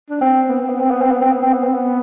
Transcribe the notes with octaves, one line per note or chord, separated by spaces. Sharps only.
D4
C4
B3
C4
B3
C4
B3
C4
B3
C4
B3
C4
B3
C4
B3